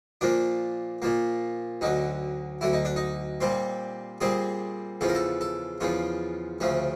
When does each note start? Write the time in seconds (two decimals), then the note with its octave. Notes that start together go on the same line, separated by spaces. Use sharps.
0.21 A#2 F3 A#3 D4
1.02 A#2 F3 A#3
1.81 D2 D3 F#3 D#4
2.61 D2 D3 F#3 E4
2.73 D#4
2.85 D4
2.96 D#4
3.41 A#2 G3 C4
4.21 A#2 G3 C4 G#4
5.01 E2 C#3 F3 A4
5.09 A#4
5.15 A4
5.41 A4
5.81 E2 C#3 F3 F4
6.61 D2 C#3 F3 A3